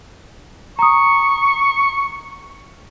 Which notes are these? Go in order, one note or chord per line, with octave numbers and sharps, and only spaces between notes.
A#5 C#6 D#6